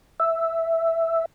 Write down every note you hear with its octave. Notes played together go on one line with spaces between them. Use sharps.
E5